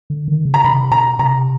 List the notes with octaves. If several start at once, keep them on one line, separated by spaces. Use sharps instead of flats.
D3
D#3
C#3
A#5
C3 B5
B2 A#5
C3 A#5